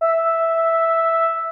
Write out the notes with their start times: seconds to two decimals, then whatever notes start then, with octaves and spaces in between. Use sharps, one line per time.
0.01 E5